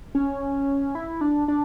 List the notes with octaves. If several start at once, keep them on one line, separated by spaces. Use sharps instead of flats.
C#4
E4
D4
D4